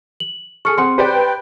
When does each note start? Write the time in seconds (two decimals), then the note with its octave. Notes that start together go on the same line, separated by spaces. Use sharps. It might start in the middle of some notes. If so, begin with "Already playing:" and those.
0.20 F#7
0.65 G#4 A4 C#6 F6 C#7
0.78 C4 G#4 F#5 C6 C#7
0.98 G4 B4 C5 D5 G5